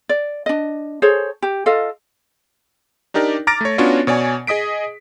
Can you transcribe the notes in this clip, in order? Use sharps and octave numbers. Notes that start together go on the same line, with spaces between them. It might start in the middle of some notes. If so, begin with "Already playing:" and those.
D5
D4 D#5
G#4 A4 C5 C#5
G4
F4 A4 D#5 F5
D4 D#4 G4 A#4 D5
A#5 D6 F6 A6 A#6 D7
A3 C#5
B3 C#4 D4 F4 F#4 C#5
B2 C#5 D5 G#5
G#4 D#5 D#6 B6 D7